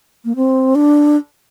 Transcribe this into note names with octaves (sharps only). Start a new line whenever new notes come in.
A#3
C4
D4